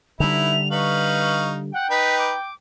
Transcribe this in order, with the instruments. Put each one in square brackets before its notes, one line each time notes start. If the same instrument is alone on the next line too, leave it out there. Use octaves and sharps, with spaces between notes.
[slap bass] D3 G3 [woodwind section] D#4 B4 E5 [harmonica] E4 [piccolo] F7
[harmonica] D#4 F5 [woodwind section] B4 C#6 [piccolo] F#7
[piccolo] F#5 [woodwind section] G5
[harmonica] D#4 B4 [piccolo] B6
[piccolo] D6